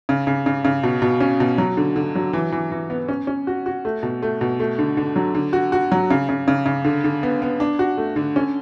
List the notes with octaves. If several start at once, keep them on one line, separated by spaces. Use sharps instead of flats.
C#3
C#3
C#3
C#3
B2
B2
C#4
B2
F#3
D3
D3
F#3
E3
E3
E3
B3
C#4
C#4
F#4
F#4
A3
B2
A3
B2
A3
D3
D3
F#3
D3
F#4
F#4
F#3
C#3
C#3
C#3
C#3
D3
D3
B3
B3
D4
F#4
A3
D3
C#4